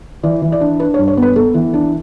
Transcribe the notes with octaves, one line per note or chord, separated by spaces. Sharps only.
E3 D5
E3
D5
D4
D4 B4
C#5
G2
C#5
B3
B4
B3 A4
E3
D4